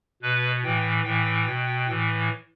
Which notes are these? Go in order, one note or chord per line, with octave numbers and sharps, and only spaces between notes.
B2 B4
A2 E3 G5
A2 E3 G5
B2
A2 E3